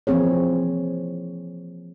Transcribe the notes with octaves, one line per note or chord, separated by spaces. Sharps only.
E3 F3 A#3 C4 G#4 C#5